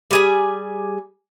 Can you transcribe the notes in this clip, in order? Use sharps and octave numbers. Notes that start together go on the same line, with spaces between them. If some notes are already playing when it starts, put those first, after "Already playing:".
G3 G#4 G#5